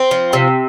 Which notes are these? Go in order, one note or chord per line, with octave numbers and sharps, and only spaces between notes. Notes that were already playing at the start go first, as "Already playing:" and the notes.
Already playing: C4
F3
C3